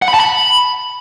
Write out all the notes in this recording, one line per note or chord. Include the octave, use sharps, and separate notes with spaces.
F#5
B5
A5
B5